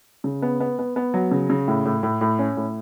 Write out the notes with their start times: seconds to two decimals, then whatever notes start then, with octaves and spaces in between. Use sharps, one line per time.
0.24 C#3
0.42 B3
0.60 B3
0.79 B3
0.96 B3
1.14 F#3
1.31 C#3
1.50 C#3
1.68 A2
1.85 A2
2.03 A2
2.21 A2
2.39 C#4
2.57 A2